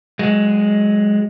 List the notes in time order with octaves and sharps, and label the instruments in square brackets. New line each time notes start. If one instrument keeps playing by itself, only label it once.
[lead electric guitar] F#3 G#3